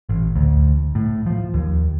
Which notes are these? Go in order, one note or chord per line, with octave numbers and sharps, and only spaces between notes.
A1
D2
A2
F3
D#2